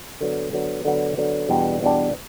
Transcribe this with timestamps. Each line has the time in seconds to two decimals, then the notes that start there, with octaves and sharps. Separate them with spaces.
0.21 D3 F#3 B3
0.53 D3 F#3 B3
0.85 D3 F#3 B3
1.17 D3 F#3 B3
1.49 E2 B2 G3 B3 D4
1.81 E2 B2 G3 B3 D4